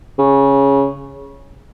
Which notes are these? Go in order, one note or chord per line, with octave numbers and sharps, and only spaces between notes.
C#3